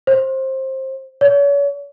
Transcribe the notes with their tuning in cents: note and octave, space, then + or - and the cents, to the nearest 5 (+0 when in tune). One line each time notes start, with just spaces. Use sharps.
C5 +20
C#5 +40